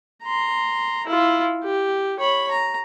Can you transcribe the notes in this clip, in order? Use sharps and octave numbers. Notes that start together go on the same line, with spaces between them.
A#5 C6
E4 F4
G4
C#5 B5
A#5